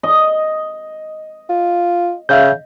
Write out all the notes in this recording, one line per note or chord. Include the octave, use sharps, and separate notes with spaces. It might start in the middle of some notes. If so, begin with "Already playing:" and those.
D#5
F4
C#3 E5 F5 G6